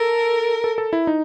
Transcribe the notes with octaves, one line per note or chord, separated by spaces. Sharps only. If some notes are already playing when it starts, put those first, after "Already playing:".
Already playing: A4 A#4
A4
A4
E4
D#4